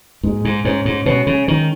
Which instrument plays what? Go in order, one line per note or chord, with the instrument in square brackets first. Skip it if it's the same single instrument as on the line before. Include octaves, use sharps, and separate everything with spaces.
[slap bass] G#2 [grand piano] G#3
[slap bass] G#2
[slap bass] G#2 [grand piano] C#4
[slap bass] G#2
[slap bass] B2 [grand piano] C#4
[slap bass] C#3
[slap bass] D#3 [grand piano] C#4